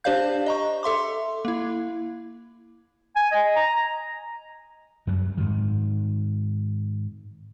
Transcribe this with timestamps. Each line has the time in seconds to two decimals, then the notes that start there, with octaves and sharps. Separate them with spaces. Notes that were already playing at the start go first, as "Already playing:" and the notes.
0.04 D4 G4 C5 D5 F5 G6
0.46 D#5 A#5 C#6
0.83 A4 E5 C6 D6
1.45 A#3 E4
3.16 G#5
3.32 D#5
3.56 A#5
5.07 F#2 F#3 G3
5.37 G#2 D#3